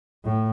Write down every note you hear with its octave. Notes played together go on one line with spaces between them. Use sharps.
A2